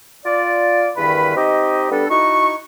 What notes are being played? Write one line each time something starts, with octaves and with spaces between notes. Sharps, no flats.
F4 D5
E2 G2 D#3 B4 B5
C4 D#4 G4 D#5
G3 B3 D4 A4
D#4 E4 F#4 C#6